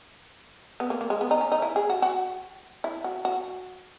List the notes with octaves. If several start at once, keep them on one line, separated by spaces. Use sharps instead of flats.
B3
A#3
A#3
G#3
B3
D#4
C#4
D#4
E4
G#4
F#4
F#4
E4
F#4
F#4